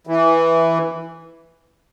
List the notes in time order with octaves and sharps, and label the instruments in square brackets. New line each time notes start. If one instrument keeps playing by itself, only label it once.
[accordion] E3